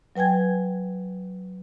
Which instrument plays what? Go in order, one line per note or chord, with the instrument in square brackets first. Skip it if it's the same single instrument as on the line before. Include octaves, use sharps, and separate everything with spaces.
[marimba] F#3 B4 G5 G#5 G#6